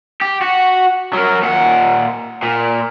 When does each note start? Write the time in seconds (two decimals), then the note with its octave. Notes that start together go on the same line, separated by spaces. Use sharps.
0.22 G4
0.42 F#4
1.14 F#3 A#4
1.42 A#2 F#5
2.43 A#2